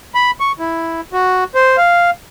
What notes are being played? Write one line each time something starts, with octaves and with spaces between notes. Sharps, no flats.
B5
C#6
E4
F#4
C5
F5